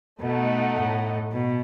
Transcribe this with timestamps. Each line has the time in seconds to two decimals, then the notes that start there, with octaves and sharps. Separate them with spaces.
0.21 B2 A3 D#4 A4 D#5 F#5
0.78 A2
1.33 B2